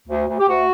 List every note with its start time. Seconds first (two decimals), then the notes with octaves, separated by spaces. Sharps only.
0.08 D2
0.28 D2
0.39 G4
0.48 D2 F#4